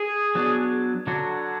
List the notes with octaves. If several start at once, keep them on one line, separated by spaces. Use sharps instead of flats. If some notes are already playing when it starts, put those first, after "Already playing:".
Already playing: G#4
F#3 B3 D4
D3 F#3 D4 F#4